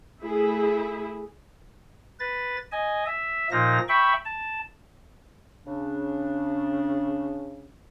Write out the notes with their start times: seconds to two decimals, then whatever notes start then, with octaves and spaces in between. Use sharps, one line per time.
0.20 A3 E4 G#4
2.20 B4 A6
2.72 D#5 G#5
3.05 E5
3.51 A#2 F3 A#3 D#4 A#6
3.88 E5 G5 B5 C#6
4.25 A5
5.66 C#3 D4